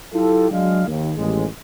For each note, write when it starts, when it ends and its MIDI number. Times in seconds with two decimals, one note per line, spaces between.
0.14 0.48 54
0.14 0.48 64
0.14 0.48 65
0.14 0.48 67
0.14 0.48 69
0.51 0.83 54
0.51 0.83 56
0.51 0.83 62
0.51 0.83 77
0.87 1.11 39
1.17 1.46 33
1.17 1.46 39
1.17 1.46 56